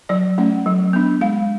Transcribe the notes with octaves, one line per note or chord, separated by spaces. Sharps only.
F#3 D5
A3 C#4
F#3
B3 D4
G#3 F5